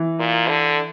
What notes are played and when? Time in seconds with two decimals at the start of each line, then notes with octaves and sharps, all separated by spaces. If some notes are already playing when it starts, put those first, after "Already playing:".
Already playing: E3
0.19 A#2
0.49 D3